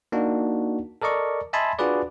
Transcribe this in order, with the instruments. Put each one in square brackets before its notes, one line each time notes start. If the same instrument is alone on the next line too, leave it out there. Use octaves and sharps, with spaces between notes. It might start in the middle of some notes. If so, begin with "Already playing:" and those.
[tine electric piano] A#3 D4 D#4 F#4
A4 A#4 D5 D#5 C#6
D#5 E5 G#5 A5 B5 C6
D4 F4 F#4 G#4 B4 D5